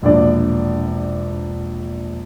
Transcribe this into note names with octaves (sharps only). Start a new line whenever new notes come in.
E1 A#1 D4 D5